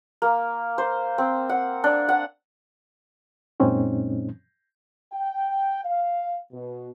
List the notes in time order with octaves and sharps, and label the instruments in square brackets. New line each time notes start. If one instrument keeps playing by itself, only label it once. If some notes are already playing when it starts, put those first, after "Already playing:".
[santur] A#3
C5
C4
F#5
D4
F#5
[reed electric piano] F#2 A#2 G#3 C4 C#4 D#4
[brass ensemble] G5
F5
B2